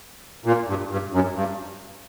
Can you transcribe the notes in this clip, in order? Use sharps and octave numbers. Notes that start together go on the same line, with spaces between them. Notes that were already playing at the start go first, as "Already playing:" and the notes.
A#2
G2
G2
F#2
G2